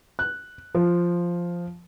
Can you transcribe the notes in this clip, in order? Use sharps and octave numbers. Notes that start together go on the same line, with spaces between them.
F#6
F3